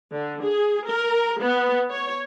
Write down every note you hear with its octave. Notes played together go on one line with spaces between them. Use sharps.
D3
G#4
A#4
B3
C#5